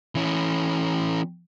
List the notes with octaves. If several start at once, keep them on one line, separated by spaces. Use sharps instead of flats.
E3 C#4